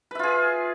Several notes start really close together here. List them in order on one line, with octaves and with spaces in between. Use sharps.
B4 E5 F4 G#4